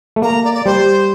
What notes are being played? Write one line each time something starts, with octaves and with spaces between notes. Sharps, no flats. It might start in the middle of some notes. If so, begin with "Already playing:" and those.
A3
A#3 A#5
D5
D5
G3 C5